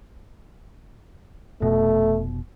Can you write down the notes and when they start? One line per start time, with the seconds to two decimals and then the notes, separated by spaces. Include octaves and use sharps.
1.62 F1 B2 A3